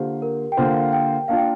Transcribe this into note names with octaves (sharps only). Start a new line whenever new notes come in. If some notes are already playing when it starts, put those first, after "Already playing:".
Already playing: D3 A#3 F4 G4 C5
A#4
G5
D3 A#3 F4 C5 F5
G5
A#3 D4 F4 F5
G5